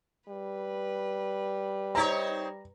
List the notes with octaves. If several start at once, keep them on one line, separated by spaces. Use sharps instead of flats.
G3 B4
C4 D#4 C#5 A#5